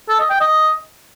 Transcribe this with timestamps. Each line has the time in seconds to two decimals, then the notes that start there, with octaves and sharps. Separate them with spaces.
0.09 A4
0.20 D#5
0.30 G5
0.41 D#5